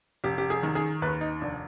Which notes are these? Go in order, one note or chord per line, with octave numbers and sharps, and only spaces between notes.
F1 G4
G4
G#4
D#3
G#4
D#2 B4
D#4
F1 D4